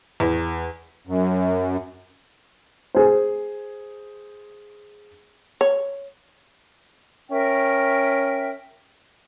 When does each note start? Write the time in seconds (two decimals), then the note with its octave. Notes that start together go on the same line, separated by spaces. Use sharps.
0.20 E2
1.07 F#2
2.94 G#4 C5
5.61 C#5
7.31 C#4 A#4 E5 G5